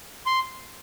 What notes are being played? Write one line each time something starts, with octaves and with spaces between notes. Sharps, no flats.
C6